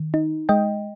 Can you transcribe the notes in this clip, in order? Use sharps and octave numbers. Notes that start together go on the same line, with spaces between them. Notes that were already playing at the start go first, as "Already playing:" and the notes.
Already playing: D#3
D#4
G#3 D#5 G5